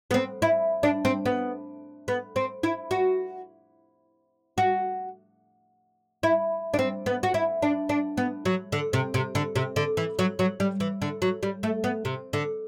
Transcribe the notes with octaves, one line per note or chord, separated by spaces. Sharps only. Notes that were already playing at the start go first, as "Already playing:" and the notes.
B3
C4
E4
D4
C4
B3
B3
C4
E4
F#4
F#4
E4
D4
C4
B3
F#4
E4
D4
D4
B3
F#3
D3
C3
C3
D3
C3
D3
E3
F#3
F#3
G3
E3
D3
F#3
G3
A3
B3
C3
D3